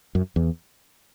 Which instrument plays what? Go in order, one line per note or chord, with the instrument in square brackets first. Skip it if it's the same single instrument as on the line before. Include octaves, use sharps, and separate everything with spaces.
[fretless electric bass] F#2
E2